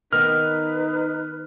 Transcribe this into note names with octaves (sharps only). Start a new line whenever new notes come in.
D#3 B3 D#4 B4 F6